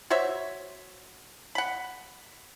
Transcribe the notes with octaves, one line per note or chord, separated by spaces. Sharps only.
F#4 C5 C#5 E5
F#5 B5